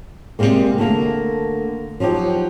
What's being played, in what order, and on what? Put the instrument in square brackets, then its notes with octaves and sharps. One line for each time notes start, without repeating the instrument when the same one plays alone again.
[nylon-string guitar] C3 E3 G3 G#3 A#3
D3 A3 A#3
F3 F#3 D#4 G4